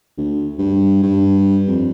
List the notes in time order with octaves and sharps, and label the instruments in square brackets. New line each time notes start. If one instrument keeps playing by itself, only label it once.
[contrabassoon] D2
G2
G2
F2